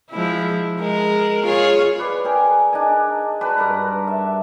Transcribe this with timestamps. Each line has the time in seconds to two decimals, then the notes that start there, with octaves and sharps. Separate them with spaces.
0.10 F3 G#3 E4
0.80 G#3 A#4
1.44 F4 G#4 C#5
1.99 B4 D5
2.25 G#4 A#4 G5
2.73 D4 D#4 G#5
3.41 F#4 B4 D5 A5
3.57 G2 A#4 F#5 A#5
4.07 E5